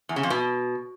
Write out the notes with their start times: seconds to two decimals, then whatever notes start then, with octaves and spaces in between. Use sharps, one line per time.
0.09 E2
0.16 C#3
0.23 F2
0.30 B2